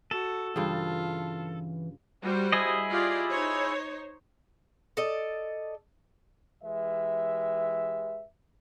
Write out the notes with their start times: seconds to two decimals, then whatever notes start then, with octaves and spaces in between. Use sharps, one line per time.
0.11 F#4 A4
0.56 G2 C#3 E3 F4
2.22 G3 F#4 C5
2.52 E4 G#4 D#5
2.90 F4 G4 D5
3.29 D#4 C5 C#5
4.97 A4 D5 D#5
6.63 E3 G#3 G4 B4 E5